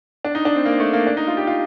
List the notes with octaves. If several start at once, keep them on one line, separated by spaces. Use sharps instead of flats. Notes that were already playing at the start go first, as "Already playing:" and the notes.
D4
D#4
D4
C4
A#3
A3
A#3
D4
D#4
F4
G4
F4